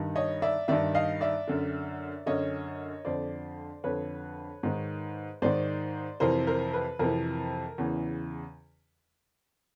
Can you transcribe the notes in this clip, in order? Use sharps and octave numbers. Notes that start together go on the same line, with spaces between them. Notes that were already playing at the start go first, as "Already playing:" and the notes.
Already playing: G2 D#3
C#5 D#5
D5 E5
G2 D#3 D5 E5
D#5 F5
D5 E5
F#2 D3
F#2 D3 C#5 D#5
F2 D3 C5 D5
F2 D3 B4 C#5
G#2 D#3
G#2 D#3 C5 D5
F2 C3 E3 A#4 C5
A#4 C5
B4
F2 C3 E3 A#4
E2 C#3 E3